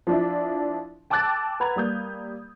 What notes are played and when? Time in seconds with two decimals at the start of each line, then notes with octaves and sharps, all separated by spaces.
0.07 F3 D4 E4
1.10 G5 A5 D6 E6 F#6 A6
1.60 B4 F#5 A#5 B5 G#6 F7
1.76 G3 A#3 D#6 G6